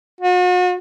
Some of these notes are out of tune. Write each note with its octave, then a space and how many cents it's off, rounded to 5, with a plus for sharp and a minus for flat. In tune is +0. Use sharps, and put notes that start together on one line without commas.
F#4 -40